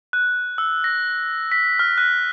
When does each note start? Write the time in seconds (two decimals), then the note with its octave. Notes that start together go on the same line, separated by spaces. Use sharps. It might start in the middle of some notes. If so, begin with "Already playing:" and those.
0.13 F#6
0.58 E6
0.84 A#6
1.52 B6
1.79 F6
1.98 F#6